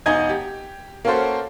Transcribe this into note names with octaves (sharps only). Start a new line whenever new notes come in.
E1 D#4 D#5 G#5 G#6
G4
A#3 C#4 F#4 A4 C5